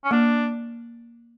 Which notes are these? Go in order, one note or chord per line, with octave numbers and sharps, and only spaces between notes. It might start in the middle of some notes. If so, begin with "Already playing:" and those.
C#4
A#3 D4